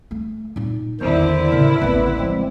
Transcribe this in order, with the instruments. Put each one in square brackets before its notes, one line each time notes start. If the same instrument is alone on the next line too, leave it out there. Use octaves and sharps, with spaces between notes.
[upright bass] A3
A#2 D#4
[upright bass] A1 [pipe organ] E2 D#3 C5 [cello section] D3 E4
[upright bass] A2 C#3 [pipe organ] A#4
[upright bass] D1 A1 [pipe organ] B3 B4
[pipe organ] F3 G#3 C4